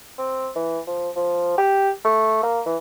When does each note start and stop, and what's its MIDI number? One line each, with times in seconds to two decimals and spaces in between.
0.18 0.49 60
0.55 0.79 52
0.87 1.10 53
1.16 1.53 53
1.58 1.90 67
2.05 2.41 57
2.43 2.61 58
2.66 2.77 52